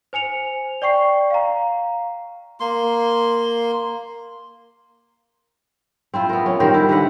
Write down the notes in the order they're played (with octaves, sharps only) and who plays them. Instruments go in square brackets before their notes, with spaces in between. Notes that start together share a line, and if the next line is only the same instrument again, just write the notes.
[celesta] C5 G#5 C#7 F7
D5 G5 C#6 C7
F5 A#5
[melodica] A#3 C6
[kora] C4 E4 F4
B3 A#4
C#4
D#3 G3 A#4 C5
E4
D3 D#3 B4 F#5